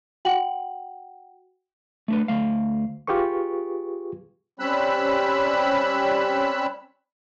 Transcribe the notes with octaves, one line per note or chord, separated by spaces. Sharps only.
F#4 F#5 G5 F#7
A3 D4 B4
D2 A3 F5
F4 G4 G#4 B4 C#6
G3 C4 C#4 B5 E6 F#6